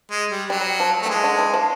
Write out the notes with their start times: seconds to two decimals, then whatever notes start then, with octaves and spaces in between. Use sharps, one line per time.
0.11 G#3
0.30 G3
0.50 F#3 G3
0.80 F3
1.02 A3
1.06 F3
1.09 E3 G#3
1.24 D3
1.39 E3
1.53 F3